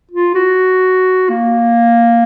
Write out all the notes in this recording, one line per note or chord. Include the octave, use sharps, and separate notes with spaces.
F4
F#4
A#3